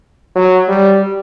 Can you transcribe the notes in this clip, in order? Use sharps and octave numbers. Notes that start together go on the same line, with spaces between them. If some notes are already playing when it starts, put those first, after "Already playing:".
F#3
G3